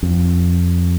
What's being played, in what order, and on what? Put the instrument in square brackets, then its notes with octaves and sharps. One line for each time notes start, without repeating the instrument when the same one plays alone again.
[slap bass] F2